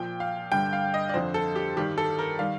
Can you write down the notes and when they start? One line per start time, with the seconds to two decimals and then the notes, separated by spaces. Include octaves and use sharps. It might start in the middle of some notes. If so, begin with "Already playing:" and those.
Already playing: A#2 F3 G5
0.20 F5
0.51 G2 D3 G3 G5
0.73 F5
0.94 D#5
1.09 D5
1.14 F2 D3 F3 C5
1.34 A4
1.56 G4
1.76 G2 D#3 G3 G4
1.98 A4
2.19 A#4
2.39 D#3 G3 F5